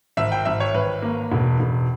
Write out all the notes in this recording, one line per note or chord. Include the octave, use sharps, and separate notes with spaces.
G#1 E5
G5
G#1 E5
C#5
G#1 B4
A#3
E1
E1